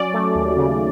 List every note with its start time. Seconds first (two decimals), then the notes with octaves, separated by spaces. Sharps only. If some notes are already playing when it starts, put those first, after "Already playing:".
Already playing: F#3 C#4 D5
0.14 A3
0.35 D#2
0.57 C#3